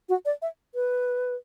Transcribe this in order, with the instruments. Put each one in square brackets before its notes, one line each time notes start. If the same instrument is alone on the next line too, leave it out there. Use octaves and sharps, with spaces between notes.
[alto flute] F#4
D5
E5
B4